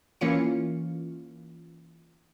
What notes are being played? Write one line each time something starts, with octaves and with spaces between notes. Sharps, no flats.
E3 A#3 C#4 F4 C#7